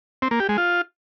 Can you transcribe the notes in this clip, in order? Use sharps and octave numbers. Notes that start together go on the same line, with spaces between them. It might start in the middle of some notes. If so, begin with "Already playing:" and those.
C4
A#3
G4
G#3
F4